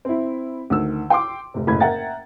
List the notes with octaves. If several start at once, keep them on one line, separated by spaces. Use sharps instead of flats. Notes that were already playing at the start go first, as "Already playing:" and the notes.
C4 E4
D2 D#3 E6
G5 C6 D6
F1 C3
F#1 A2 B5 G#6
A#4 E5 F#5 G5 A#5 A6